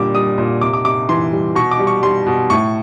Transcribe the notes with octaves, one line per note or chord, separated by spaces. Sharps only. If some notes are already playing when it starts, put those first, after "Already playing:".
Already playing: A#2 D3 G3 D6
G3 D#6
A#2
C3 D6
D6
C3 D6
E3 C6
G3
B2 C#6
D6
G3
C#6
G3 C6
B2
A2 C#6